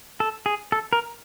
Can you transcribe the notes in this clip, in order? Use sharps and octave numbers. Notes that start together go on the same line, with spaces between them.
A4
G#4
A4
A#4